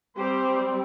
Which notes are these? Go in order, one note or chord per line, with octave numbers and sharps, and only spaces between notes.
G3 C4 G4 C5